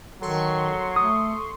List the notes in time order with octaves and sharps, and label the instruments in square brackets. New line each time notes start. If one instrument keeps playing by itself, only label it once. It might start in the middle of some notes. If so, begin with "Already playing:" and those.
[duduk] D#3 [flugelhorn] F#3 [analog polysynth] A4 C6 C#6
[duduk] A3 [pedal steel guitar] D#6